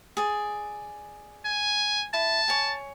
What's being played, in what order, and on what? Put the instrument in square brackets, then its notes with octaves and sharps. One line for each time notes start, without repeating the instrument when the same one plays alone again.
[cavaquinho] G#4 D5
[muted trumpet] G#5
[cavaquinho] E4 [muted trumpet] A5
[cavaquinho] C#5 G#5